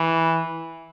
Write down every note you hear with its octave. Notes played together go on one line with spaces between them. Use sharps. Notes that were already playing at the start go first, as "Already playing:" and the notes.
Already playing: E3